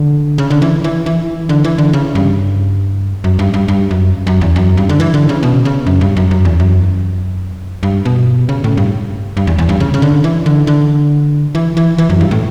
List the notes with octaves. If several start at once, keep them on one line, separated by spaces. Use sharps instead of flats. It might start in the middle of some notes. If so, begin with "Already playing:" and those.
Already playing: D3
C#3
D3
E3
E3
E3
D3
E3
D3
C#3
G2
F#2
G2
G2
G2
F#2
F#2
E2
F#2
G2
D3
E3
D3
C#3
B2
C#3
F#2
G2
F#2
F#2
E2
F#2
G2
B2
C#3
A2
G2
G2
E2
E2
G2
C#3
C#3
D3
E3
D3
D3
E3
E3
E3
F#2
G2
A2